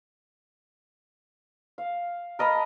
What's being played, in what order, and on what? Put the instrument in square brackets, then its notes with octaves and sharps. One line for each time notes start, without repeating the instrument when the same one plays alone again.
[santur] F5
A#4 D#5 A5 B5